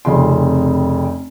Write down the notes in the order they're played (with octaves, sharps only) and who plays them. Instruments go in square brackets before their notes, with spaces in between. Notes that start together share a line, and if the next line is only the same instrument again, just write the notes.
[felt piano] F1 F2 C#3 C6